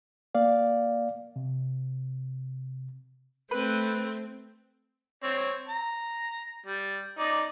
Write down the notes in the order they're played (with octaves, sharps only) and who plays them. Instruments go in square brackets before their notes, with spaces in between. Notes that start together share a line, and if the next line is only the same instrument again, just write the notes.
[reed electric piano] A#3 D5 F5
C3
[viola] A3 C4 [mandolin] B4
[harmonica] C4 C#5
A#5
G3
D#4 D5